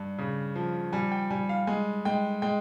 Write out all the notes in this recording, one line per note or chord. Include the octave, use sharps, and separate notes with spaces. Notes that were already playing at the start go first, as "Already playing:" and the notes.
Already playing: G2
C#3
F3
G3 G#5
G5
G3 G#5
F5
G#3 G#5
G#3 G5
G#3 G5